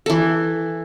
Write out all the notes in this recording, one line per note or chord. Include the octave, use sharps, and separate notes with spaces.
E3 A4